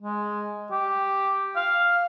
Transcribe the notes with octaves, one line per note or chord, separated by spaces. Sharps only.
G#3
G4
F5